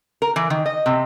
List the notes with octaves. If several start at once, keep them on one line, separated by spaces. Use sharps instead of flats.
A#4
E3
D#3
D#5
C3